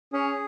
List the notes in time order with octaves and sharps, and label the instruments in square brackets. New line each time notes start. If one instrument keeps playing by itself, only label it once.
[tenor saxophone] C#4 [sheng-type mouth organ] G#4